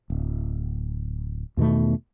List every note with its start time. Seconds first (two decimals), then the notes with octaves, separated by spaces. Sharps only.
0.10 D1
1.57 E2 B2 D#3 A3